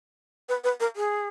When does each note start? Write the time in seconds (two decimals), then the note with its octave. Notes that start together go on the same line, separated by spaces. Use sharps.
0.49 B4
0.64 B4
0.80 A#4
0.96 G#4